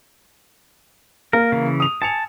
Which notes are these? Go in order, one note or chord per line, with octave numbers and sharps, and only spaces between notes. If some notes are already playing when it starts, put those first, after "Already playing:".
A#3 A#4
C#3 E3
D#6 F7
G#5 A5 C#7 F7